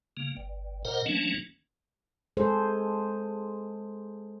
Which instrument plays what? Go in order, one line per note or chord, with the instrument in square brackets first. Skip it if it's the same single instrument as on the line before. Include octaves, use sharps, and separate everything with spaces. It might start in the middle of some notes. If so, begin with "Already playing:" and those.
[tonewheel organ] C#3 A#3
G1
A#2 A#4 C5 D#5 F#5 A#5
E3 F#3 A3 A#3 C#4 D4
[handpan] G#3 G#4 A4 C5